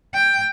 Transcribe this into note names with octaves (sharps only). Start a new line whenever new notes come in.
G5